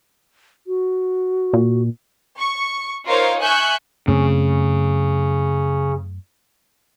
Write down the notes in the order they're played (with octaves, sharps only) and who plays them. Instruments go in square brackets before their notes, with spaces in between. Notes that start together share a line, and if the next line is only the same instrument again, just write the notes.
[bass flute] F#4
[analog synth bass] A#2
[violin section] C#6
D#4 F4 A#4 C5 C#5 F5
E5 G#5 C#6 F#6 G6
[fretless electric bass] F#2 A3 C4 [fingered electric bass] C#3